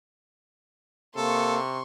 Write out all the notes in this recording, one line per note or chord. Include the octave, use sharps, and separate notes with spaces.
C3 A#3 A4 C6 C#6